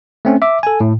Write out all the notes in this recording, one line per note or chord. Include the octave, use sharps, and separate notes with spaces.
A3 C4 C#4
E5 D6
A4 G#5
A2